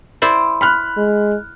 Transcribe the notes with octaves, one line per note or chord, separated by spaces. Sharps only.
E4 C5 D5
B5 F6 F#6
G#3